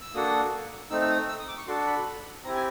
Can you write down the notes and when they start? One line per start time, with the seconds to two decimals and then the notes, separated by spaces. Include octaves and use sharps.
0.01 E6
0.14 A#3 D4 F#4 A4 D#6
0.90 A3 C4 D#4 E6
1.01 E6
1.10 D#6
1.29 E6
1.39 D#6
1.48 D6
1.58 C#6
1.67 D4 F#4 A4 C6
1.87 B5
2.44 C4 E4 G4 A#5
2.55 G#5